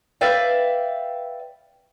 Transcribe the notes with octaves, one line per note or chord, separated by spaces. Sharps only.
B4 D5 E5 F5 G5